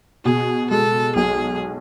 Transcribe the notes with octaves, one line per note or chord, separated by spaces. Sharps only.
B2 G#4
G#3 A4
B1 G#4